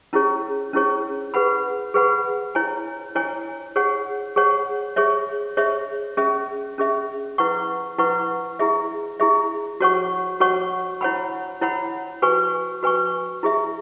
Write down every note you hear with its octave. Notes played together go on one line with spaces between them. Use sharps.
C#4 E4 G#4 C#5
C#4 E4 G#4 C#5
G#4 B4 F#5 B5
G#4 B4 F#5 B5
E4 C#5 G#5
E4 C#5 G#5
G#4 C#5 F#5
G#4 C#5 F#5
G#4 C#5 E5
G#4 C#5 E5
C#4 G#4 E5
C#4 G#4 E5
E4 B4 F#5 C#6
E4 B4 F#5 C#6
E4 G#4 E5
E4 G#4 E5
F#4 C#5 F#5 C#6
F#4 C#5 F#5 C#6
E4 C#5 F#5 B5
E4 C#5 F#5 B5
F#4 B4 G#5 C#6
F#4 B4 G#5 C#6
E4 G#4 E5